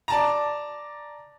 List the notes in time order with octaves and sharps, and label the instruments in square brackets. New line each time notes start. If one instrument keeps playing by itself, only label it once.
[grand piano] D5 A5 A#5